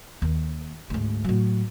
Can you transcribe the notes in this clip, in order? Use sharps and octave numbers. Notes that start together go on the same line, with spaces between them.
D#2
D2 G#2
A2 F#3